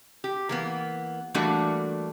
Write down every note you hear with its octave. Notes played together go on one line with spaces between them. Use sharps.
G4
E3 A#3 B3
E3 G3 A3 A#3 D4 F#4